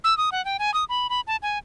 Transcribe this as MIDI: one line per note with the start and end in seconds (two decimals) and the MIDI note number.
0.04 0.17 88
0.18 0.30 87
0.32 0.44 78
0.45 0.57 79
0.59 0.73 80
0.74 0.84 87
0.89 1.07 83
1.10 1.21 83
1.27 1.36 81
1.42 1.58 80